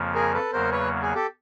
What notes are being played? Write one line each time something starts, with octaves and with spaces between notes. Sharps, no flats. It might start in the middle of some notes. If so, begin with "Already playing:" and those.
Already playing: F2 C#3 F3 A#3
G#4 A#4
A4 B4
E2 C#3 F#3 A#3 A#4 C5
B4 C#5
G#4
G4 A4